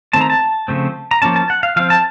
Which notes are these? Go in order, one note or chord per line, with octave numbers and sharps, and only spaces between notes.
D#3 A3 C4 A5
A#5
A5
C#3 F3 A3 C4
A#5
F3 A#3 C#4 A5
A5
F#5
F5
F3 C4 F5
A5